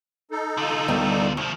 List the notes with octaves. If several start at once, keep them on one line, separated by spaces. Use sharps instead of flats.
D#4 A4
D3 F4
D2 D#3 G3 B3 D5
D#2 C3 F3